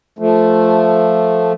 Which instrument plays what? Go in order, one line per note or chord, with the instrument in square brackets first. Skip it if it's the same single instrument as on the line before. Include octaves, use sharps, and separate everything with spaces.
[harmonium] F3 A3